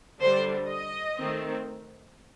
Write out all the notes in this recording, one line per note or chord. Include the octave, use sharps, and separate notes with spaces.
D3 G3 D4 C5
D#5
D#3 A3 C4